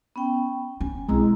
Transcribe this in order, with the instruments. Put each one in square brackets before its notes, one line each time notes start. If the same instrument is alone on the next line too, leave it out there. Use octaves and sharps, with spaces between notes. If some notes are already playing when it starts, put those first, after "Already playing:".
[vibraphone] B3 C#4 G5
[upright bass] C#4 [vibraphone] G#5
[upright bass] B1 C4 [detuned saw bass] G#3 [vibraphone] E4 A#5